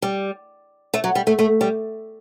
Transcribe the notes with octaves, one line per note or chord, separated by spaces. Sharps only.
G3
A3
F#3
G3
A3
A3
G3